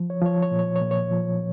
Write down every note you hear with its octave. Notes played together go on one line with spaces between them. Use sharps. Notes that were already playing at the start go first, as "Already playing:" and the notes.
Already playing: F3
C#5
F3 C#5
C#5
A#2
C#5
C#5
A#2
C#5
F3